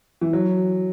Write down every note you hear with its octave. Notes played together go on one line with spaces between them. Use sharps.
E3
F#3